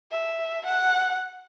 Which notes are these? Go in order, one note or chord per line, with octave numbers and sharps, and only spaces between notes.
E5
F#5